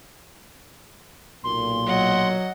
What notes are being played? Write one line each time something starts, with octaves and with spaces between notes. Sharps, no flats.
B1 A#2 C6
F#3 D#5 F#5